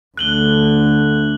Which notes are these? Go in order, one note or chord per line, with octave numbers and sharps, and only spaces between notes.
D2 D3 F#6 F#7 G7